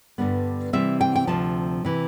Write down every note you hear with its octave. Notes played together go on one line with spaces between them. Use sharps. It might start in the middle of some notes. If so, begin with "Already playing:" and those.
G2 D3 G3 B3
C3 E3 G3 C4 E5
G5
G5
D2 C3 F3 A5
C3 E3